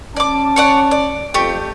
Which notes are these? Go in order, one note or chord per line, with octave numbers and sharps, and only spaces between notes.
C#4 D5 A5 D6
C#5 D5 F#5
D5
F2 A3 G4